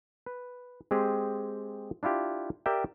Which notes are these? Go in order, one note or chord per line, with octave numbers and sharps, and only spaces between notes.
B4
G#3 C4 G4 G#4
D4 E4 F4 G4
G4 A#4 D5 E5 G5